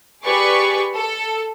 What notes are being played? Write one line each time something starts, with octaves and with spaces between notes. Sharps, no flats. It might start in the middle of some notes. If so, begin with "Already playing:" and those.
G4 G#4 B4 D5 C#6
A4